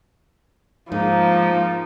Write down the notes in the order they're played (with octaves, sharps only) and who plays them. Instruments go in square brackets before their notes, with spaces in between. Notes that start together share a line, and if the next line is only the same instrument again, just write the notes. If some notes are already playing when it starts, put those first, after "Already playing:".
[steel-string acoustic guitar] G#2 [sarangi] F3 [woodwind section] A#3 D#4